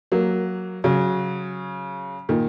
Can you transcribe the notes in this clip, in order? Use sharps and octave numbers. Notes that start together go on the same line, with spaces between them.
F#3 A#3
C#3 F#3
A#2 D#3